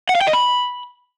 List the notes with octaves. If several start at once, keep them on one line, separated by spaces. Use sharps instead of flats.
F#5
F5
G5
D#5
B5